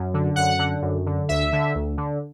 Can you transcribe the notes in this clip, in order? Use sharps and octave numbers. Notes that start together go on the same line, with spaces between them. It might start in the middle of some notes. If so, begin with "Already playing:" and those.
Already playing: F#2
D3
F#2 F#5
D3
F#2
D3
D2 E5
D3
D2
D3